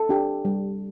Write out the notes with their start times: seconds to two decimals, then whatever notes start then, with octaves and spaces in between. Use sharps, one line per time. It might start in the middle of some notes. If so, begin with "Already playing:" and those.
Already playing: A4
0.09 D4 G4
0.45 G3